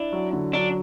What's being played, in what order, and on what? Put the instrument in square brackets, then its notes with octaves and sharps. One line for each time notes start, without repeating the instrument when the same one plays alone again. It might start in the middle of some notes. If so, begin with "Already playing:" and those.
Already playing: [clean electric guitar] D4 [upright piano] E4
[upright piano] F#3
D3
[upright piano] F#3 [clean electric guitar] D4